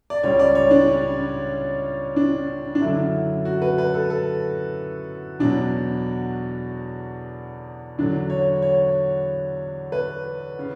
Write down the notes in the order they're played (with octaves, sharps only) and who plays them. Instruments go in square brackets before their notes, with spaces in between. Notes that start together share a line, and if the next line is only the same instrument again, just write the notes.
[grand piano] D5
C#2 C#3 G3 C#5
D5
C#5
D4
C#4
D4
D4
F#2 D3 F#3 E4
F#4
B4
B4
A4
A4
E2 B2 F#3 D4
E2 D3 F#3 D4
C#5
C#5
B4
C#3